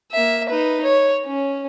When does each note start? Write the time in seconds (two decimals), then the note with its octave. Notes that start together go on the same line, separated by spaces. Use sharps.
0.12 A#3 E5
0.49 D#4 B4
0.84 C#5
1.26 C#4